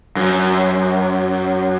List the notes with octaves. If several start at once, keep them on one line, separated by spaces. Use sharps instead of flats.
F#2